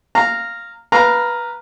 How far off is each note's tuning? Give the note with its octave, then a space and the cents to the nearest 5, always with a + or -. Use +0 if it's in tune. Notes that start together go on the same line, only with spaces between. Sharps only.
F5 +0 A#5 -10
B4 -15 F5 +0 A#5 +0